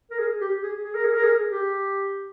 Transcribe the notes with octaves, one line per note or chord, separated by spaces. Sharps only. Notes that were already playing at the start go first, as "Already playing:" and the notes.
A#4
G#4
G4
G#4
G#4
A#4
G#4
A#4
G#4
G4